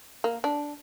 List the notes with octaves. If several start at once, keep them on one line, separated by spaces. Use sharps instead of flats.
A#3
D4